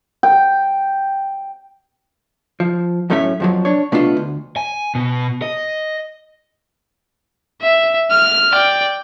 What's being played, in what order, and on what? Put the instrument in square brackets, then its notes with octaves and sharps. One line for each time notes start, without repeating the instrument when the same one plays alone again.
[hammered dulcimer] G5
[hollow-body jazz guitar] F3
F#2 A2 A3 C#4 A#4 E5
F2 F3 F#3
D4 C#5
B2 A3 B3 D4 F4
D2
[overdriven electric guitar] G#5
B2
D#5
[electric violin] E5
F6
D5 G5